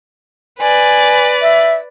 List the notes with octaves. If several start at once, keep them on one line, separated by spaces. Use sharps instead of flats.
B4 D5 G#5
E5